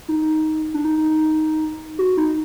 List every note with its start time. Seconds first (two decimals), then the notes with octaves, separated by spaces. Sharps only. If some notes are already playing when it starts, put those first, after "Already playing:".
0.09 D#4
0.74 D4
0.85 D#4
1.99 F#4
2.17 D#4